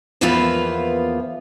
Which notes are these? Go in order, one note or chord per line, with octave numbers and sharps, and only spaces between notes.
E2 E3 F3 A#3 B3 F4